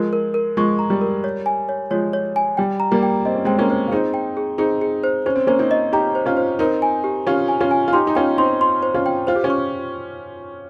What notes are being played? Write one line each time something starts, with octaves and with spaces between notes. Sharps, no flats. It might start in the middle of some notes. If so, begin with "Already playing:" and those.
Already playing: F3 G#3 A#4
A#4
A#4
F3 G#3 C#6
A#5
G3
A#4
C#5
G#5
C#5
F3 G#3 C#5
C#5
G#5
G3 G5
A#5
G3 A#3
G5
C4 D#5
C#4
G#3 C4 G5
A#3 C#4
C5
F4
C4 D#4 G#4
G5
G#4
C4 D#4 G#4
G#4
C5
C#4 C5
C4
A#3 C#4 C5
C4 D#4
D#5
D#4 G4 A#5
C5
C#4 F4
C5
C4 D#4 A#4
G#5
G4
C#4 F4 G4
G#5
C#4 F4
G#5
F4
D#4 G4 C6
D#4
C#4 F4 G5
C4 D#4 C6
C6
C5
C#4 F4
G5
F4 C5
G4
C#4 F4
C#6